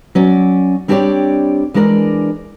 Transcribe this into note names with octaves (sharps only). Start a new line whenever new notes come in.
F#3 C#4 D5
G3 C4 D4 G4 C#5 D5
E3 G#3 D4 A#4 D5